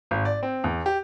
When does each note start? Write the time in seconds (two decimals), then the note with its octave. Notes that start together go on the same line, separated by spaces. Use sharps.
0.11 G#1
0.25 D5
0.43 C4
0.64 E2
0.86 G4